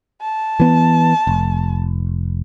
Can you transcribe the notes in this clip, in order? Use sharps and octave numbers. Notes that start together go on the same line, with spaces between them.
A5
E3 B3
F1